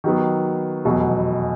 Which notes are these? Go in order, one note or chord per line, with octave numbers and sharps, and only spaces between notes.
D#3 F#3 B3
F1 E2 B2 F#3